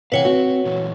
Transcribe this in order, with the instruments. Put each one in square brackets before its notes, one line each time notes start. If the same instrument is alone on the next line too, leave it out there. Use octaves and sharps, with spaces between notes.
[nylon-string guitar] C3 E3 [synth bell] B4 C#5 F#5 [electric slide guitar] F5
[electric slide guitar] C4 [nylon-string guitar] F#4
[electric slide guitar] A#2 E3 F#3